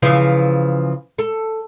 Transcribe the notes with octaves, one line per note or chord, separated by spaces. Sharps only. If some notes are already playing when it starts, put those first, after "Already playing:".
C#3 E3 F3
A4